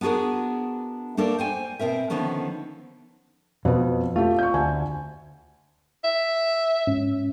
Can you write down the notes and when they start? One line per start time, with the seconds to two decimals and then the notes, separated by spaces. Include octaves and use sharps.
0.01 B3 D4 F#4 G#4 A#4
1.17 A3 A#3 D4 A4 A#4
1.38 C5 G5 G#5
1.79 B2 C4 A#4 E5
2.10 D3 D#3 F3 B3 C#4
3.65 F2 B2 B3 B4
4.16 A3 F4 G4
4.39 C#6 G6
4.54 D2 G#5 A5
6.04 E5
6.87 G#2 C#4